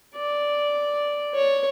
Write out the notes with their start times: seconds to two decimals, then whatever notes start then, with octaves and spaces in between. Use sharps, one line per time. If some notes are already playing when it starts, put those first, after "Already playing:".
0.15 D5
1.34 C#5